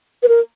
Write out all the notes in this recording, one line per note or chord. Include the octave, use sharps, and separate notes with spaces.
B4
A#4